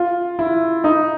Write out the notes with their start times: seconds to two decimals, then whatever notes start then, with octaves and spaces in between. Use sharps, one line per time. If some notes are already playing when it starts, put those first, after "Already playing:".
Already playing: F4
0.39 E4
0.84 D#4